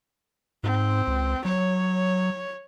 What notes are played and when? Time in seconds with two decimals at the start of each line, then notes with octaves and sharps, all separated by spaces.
0.63 G#2 C4
1.07 C#2
1.45 F#3 C#5